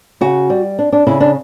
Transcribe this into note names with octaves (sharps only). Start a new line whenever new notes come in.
C#3 F#4
G3
D4
D4
C#3 E4
D4